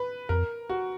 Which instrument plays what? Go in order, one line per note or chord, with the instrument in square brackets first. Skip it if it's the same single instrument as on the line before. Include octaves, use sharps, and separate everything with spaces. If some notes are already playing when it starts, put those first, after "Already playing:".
Already playing: [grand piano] B4
[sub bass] F2 [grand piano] A#4
[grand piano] F#4